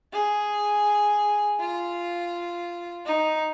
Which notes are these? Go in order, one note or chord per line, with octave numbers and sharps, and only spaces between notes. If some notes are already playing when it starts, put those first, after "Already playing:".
G#4
F4
D#4